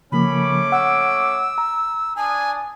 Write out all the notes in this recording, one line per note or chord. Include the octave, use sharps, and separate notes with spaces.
C#3 F3 A3 A#3 C#4 B5 D6
F#5 E6
A#5
D4 G#5 A5 D#6